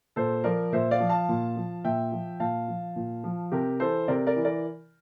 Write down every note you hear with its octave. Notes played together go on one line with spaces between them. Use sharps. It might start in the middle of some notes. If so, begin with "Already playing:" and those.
A#2 A4 C5
F3 A#4 D5
A#2 C5 E5
D5 F5
F3
F5 A5
A#2
F3
A#2 E5 G5
F3
A#2 F5 A5
F3
A#2
F3
C3 G4 A#4
E3 A4 C5
C3 A#4 D5
A#4 D5
E3
A#4 D5